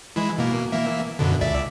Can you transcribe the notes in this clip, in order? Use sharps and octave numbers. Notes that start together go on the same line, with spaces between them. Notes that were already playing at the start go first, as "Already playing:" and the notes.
E3 G#3 E4
B2 A#3
E3 A#3 E5
F#2 B2 D3
C#2 D5 E5